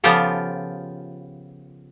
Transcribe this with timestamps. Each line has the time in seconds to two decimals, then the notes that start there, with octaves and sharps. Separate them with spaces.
0.04 C#3 F3 B3 F4 G4 A4